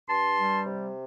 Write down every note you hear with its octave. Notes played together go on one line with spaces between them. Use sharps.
G2 A5 C6
G3
C3